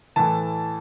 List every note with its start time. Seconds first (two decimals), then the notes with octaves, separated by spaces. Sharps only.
0.16 A2 E3 A5